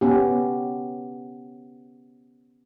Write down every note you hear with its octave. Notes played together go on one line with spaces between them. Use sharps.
B3 C#4 G4